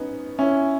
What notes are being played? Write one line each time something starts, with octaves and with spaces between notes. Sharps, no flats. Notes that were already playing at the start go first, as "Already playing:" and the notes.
Already playing: B3 C#4 D#4
C#4 E4